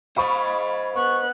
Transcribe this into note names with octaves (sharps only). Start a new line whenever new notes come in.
C5 D#5 F5 B5 C#6
B3 C#6 F#6